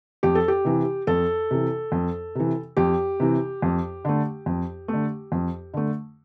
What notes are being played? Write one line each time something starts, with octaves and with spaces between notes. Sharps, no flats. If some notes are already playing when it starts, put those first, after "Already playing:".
F2 G4
A4
G4
C3 E3
F2 A4
C3 E3
F2
C3 E3
F2 G4
C3 E3
F2
D3 A3
F2
A3
D3
F2
D3 A3